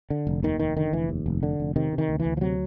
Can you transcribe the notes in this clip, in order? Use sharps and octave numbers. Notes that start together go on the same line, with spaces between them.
D3
F1
D#2 D#3
F1 D#3
D3 D#3
F1 E3
D#2
F1
D3
F1
C3 D#3
C3
D#3
D2
E3
D2
F3
C3 F#3